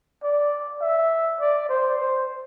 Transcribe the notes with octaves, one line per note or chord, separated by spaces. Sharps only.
D5
E5
D5
C5
C5